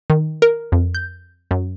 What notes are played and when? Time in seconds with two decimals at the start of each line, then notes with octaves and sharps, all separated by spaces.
0.10 D#3
0.42 A#4
0.72 F2
0.95 G6
1.51 F#2